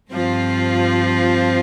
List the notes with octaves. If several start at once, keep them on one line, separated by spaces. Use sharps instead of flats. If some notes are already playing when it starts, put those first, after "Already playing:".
G2 F3 C4 F4